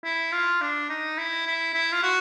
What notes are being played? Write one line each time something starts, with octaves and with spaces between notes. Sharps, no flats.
E4
F4
D4
D#4
E4
E4
E4
F4
F#4